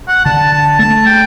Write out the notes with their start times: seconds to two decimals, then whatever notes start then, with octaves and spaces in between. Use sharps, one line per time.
0.08 F#5
0.25 D3 A5
0.53 A5
0.79 A3 A5
1.06 G5